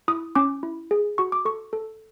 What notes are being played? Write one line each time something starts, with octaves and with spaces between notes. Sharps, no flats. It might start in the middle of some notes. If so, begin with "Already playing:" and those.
E4 D#6
C#4 D6
E4
G#4
F#4 C#6
D6
A4 C#6
A4